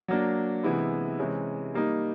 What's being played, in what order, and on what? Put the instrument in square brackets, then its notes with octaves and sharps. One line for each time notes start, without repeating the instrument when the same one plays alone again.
[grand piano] F#3 A#3 D4
C3 E3 G#3 B3 E4
C3 E3 G#3 C#4
G3 A#3 D#4